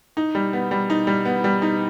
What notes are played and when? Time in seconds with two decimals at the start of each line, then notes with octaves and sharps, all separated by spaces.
0.17 D#4
0.35 G3
0.53 B3
0.71 G3
0.90 D#4
1.07 G3
1.25 B3
1.44 G3
1.62 D#4